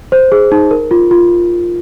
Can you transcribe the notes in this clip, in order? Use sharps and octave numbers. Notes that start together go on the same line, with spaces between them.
C5
G#4
D#4
A#4
F4
F4